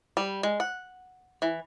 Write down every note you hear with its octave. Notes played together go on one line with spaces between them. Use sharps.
G3
G#3
F#5
E3